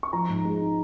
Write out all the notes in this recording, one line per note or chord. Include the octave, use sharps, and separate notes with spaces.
C#6
F3 A#5
G#2
G#3
D#4